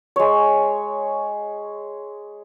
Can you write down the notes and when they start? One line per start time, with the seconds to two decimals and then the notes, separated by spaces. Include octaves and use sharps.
0.16 G#3 C#5